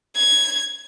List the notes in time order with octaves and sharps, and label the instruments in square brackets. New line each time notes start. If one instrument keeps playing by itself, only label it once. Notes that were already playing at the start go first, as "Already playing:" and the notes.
[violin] G#6